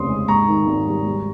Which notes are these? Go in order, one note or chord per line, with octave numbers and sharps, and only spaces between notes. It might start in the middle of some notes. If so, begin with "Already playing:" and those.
Already playing: F1 D#2 C#3 C4 C6 D#6
G#3
G#2 A#5 C#6
D#3
G#1
G3
G3